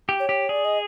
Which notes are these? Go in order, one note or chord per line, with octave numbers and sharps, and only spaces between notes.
G4
C#5
G4
G#4 D5
D#5